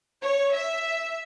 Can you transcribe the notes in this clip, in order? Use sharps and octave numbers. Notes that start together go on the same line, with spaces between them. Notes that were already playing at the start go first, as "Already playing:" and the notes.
C#5
E5